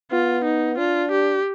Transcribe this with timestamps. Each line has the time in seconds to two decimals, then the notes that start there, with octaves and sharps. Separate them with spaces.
0.12 B3 F4
0.45 D#4
0.78 D4 F4
1.11 G4